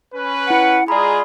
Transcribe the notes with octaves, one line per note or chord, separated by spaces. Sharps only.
C#4 B4
E4 F#5 C#7
G#3 F4 G#4 D5 A#5 B5